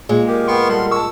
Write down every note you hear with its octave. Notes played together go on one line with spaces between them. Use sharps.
A#2 G#3
G4 A#4
B3 G5 C6 C#6
G3 A4 F#5 C6
A5 C#6 E6